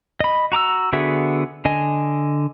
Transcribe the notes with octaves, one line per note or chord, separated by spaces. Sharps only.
D#5 B5
F#4 A#5 D6 E6
D3 B3 F#4 G#4 E5
D3 D#5 G#5